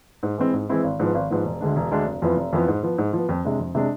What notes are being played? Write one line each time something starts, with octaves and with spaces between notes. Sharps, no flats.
G#2
E3 G#3 C4 E4
G#2
E3 G#3 C4 E4
G#1
G#2 F3 B3
G#1
G#2 F3 B3
E1
D2 D3 G#3 D4
E1
D2 D3 G#3 D4
F1
F2 E3 B3 F4
F1
F2 E3 B3 F4
G#2
F3 B3
G#2
F3 B3
F2
C3 G#3 D4
F2
C3 G#3 D4